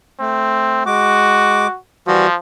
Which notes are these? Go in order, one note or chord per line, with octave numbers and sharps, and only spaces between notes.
A3 C4
G#3 F#4 D6
E3 F3 G3 F#4